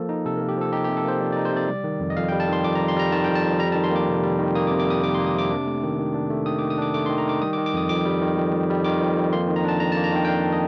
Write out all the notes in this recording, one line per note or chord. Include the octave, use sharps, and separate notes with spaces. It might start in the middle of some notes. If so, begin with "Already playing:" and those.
Already playing: F3 A#3 A4
D#4
C3 A4
A#4
A#3
G4
F3 A4
D#4 G4
G4
C3
A4
A#3 C5
F3 D5
D5
D#4
C5
C3 D5
G3
D#3
F2
D#5
F2 F5
G3 G5
A5
D#3 C6
F2 D6
A#5
F2
C6
G3 A#5
D#3 A5
G5
F2
A5
F2
G3 A#5
D#3 A5
C6
A#3 D6
C3
G3
D#3
A#3 D#6
D6
C3
D6
G3 D#6
D#3 D6
C6
A#3
D#6
C3 D6
D4
A3
D#3
D#3
D4
A3
D#3 D#6
D#3 D6
D#6
D4 D6
A3 D6
D#3 C6
A#5
D#3 D6
G3 D#6
D6
D#3
D6
F2 D#6
F2 D6
G3
D#3
F2
F2
G3
D#3 D6
F2
F2
A#3 C6
D#3
A#5
D4 A5
F2 A#5
A5
A#3
A#5
D#3 G5
G5
D4 F5
D#5